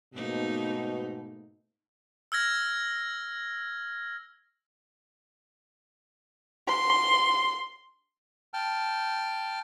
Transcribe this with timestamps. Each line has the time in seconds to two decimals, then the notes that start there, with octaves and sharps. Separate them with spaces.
0.14 G#2 B2 A3 A#3 D#4
2.32 E6 F6 G#6 A#6
6.68 C6
8.54 G5 A5 F6